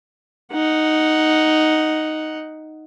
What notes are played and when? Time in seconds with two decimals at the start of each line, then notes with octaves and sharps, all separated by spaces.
0.52 D#4 F#5